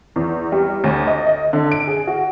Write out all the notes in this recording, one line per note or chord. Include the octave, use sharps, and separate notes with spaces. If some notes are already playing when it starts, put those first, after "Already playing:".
E2
G3
D2
D#5
D#5
D3
D7
G#4
F#4